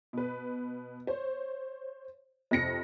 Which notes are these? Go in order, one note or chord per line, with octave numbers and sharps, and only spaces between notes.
B2 B4
C5 C#5
F2 C3 A#6 C#7